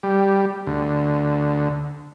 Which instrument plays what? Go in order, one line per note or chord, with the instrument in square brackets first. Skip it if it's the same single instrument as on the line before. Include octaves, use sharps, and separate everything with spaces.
[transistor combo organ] G3
D2